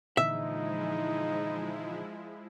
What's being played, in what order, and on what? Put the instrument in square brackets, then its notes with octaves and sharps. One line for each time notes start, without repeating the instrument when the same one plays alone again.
[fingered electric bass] A#2 D3 E3 [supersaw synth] F3 G#3 E4 [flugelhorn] D#4 [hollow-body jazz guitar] E5